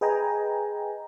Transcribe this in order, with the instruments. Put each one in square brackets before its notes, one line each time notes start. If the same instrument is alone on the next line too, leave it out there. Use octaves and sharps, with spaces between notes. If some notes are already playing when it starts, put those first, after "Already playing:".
[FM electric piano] G#4 B4 D#5 G5 G#5 A#5